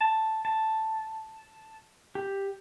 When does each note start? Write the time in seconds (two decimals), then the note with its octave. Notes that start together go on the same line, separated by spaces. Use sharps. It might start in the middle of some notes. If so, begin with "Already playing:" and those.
0.01 A5
0.45 A5
2.15 G4